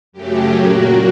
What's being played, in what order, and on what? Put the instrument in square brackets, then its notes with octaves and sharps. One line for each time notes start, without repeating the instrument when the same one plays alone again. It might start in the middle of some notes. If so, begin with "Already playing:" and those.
[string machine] F#2 C#3 F#3 A3 G4
A#2 F#3 A#3 F#4